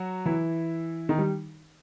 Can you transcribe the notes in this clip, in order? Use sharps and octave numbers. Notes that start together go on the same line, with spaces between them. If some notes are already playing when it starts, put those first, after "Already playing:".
Already playing: F#3 F#4
E3 E4
D#3 D#4
G3